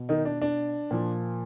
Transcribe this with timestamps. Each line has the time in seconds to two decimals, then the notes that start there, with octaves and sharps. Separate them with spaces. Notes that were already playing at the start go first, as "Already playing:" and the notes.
Already playing: B2
0.09 D#3 D#4
0.25 D4
0.42 D4
0.91 A#2 F3